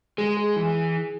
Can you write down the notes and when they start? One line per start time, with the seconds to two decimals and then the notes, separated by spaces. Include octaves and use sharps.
0.18 G#3 G#4
0.37 G#4
0.56 E3